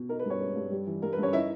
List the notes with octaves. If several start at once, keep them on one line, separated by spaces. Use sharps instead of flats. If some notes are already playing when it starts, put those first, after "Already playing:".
Already playing: B2
D#4 A#4
B4
G2
C#4 C#5
G#3
G2
G3
E3
G2 A#4
B4
G2 C#4 C#5
D#4 E4 E5